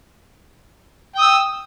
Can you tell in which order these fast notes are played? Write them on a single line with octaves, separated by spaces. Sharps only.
G5 D#6 E6